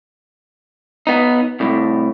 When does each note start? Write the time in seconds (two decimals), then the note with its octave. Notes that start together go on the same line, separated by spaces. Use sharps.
1.07 B3 D#4
1.60 C2 A2